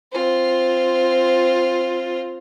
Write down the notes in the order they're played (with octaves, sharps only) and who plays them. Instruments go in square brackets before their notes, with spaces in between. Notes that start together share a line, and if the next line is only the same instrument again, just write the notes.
[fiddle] C4 F4